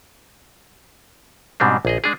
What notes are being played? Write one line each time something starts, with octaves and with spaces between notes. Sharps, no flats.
G#2 B2 G3 C4 D4
A#1 G#4 D#5
G#3 D4 G#4